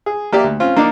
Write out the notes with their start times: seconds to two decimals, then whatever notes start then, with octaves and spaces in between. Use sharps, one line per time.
0.06 G#4
0.32 A#3 G4 D5 E5
0.44 D2
0.60 C4 C#4 F4
0.76 A#3 D4 D#4 D5